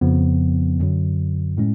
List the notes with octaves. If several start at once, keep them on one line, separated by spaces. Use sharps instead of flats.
F2 C#3 F3 B3
F#2 D3 F#3
A2 G#3 C#4